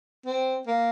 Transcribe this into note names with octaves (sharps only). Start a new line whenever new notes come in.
C4
A#3